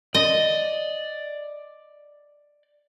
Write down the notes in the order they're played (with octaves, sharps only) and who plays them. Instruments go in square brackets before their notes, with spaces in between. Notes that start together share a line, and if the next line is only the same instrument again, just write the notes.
[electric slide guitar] D5 [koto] D#5